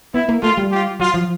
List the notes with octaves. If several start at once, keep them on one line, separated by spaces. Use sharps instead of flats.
B3 E4
A#3
A3 F4
G3
F4 G4
F#3 F4
F3